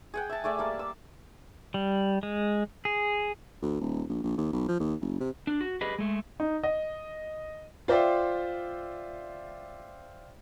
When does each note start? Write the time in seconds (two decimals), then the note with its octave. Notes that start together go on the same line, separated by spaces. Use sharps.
0.14 G#4 F#5 G5
0.30 E5 A5
0.44 A3 G#4 D5 E5
0.59 G3 A#3 A5
0.79 E6
1.74 G3
2.23 G#3
2.85 G#4
3.62 D2
3.80 D#1
4.09 A#1
4.24 A#1
4.37 D#2
4.53 B1
4.68 F3
4.80 D#2
5.01 F#1
5.20 C3
5.47 D4
5.61 F#4
5.81 G4 G#4 B4 D#5
5.99 G#3 A3
6.40 D#4
6.63 D#5
7.88 F4 C5 D5 E5 G5